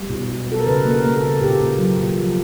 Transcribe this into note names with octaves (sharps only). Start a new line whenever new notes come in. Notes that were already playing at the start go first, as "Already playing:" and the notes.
Already playing: G3
B2
B2
B2 A4
A#4
C#3 B4
A#3
A#4
A#3
A4
C#3
A#2 G4
A#2
F#3
A#2
F3